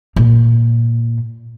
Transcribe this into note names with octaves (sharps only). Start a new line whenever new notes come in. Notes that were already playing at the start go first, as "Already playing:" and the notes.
A#2